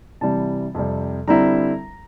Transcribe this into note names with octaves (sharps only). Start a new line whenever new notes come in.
C3 E3 G3 A5
F2 C3 G3
D3 G3 C4 E4 A#5